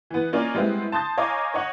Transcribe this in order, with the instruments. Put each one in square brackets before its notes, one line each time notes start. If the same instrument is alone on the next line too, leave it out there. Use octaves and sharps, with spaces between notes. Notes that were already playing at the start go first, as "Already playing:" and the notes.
[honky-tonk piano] E3 B3
A#3 C#4 F4 A#4 D5 D#5
G3 G#3 B3 C4 E4
A5 C6 D#6 G6 A6
C#5 D#5 F5 G#5 A#5 D6
C#5 D#5 F#5 C#6